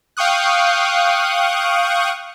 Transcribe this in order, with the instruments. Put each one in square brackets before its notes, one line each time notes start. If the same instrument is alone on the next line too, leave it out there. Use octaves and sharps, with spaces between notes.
[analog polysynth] F5 G5 C#6 D#6 F#6